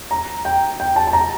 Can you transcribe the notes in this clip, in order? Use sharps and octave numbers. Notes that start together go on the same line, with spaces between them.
A#5
G5
G5
A5
A5
A#5